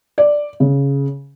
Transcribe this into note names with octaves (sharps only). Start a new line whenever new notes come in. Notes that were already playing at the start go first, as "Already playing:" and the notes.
D5
C#3